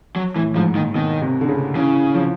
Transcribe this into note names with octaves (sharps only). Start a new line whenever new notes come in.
F#3
A2 E3
G#2 F3
A#2 D#3
B2 D#3
C3
D3
C#3
C#3 E3
F3